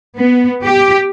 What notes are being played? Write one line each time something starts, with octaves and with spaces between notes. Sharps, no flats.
B3
G4